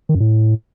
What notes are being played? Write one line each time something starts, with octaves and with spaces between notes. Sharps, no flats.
D#3
F#2
A2